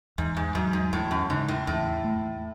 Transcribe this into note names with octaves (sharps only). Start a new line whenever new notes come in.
E2 G#2
G#2
G#2 F#3
G#2
E2 A2
F#2
G#2 C#3
A2
E2 A2
A3